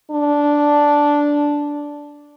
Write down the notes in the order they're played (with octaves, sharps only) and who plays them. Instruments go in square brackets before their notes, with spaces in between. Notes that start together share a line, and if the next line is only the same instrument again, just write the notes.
[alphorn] D4